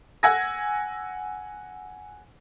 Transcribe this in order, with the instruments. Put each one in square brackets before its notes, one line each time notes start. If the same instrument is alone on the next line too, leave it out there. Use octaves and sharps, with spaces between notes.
[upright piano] F#5 G#5 E6 G#6 A#6